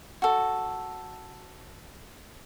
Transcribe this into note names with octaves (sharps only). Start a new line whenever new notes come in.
F#4 A4